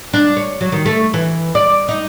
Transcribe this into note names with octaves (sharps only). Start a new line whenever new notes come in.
D4
C#5
F#3
D#3
A3
E3
D5
D#4